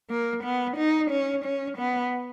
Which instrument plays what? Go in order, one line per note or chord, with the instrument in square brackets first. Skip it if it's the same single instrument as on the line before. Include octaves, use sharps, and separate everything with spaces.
[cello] A#3
B3
D#4
C#4
C#4
B3